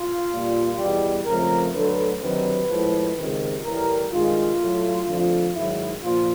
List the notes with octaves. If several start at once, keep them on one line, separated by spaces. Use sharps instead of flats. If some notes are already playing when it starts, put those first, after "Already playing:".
Already playing: F4
A#2 G3
E2 B2 G3
F2 C#3 F3 A3 A#4
D2 D3 F#3 A3 B4
D2 C3 D#3 F#3 B4
A2 F3 G#3
C#2 C3 D#3
A2 E3 G3 A#4
G2 D#3 G#3 F4
A2 F#3 A3
F2 D3 F3 A3
G#2 D#3 F#3 E4
A#2 F3 F4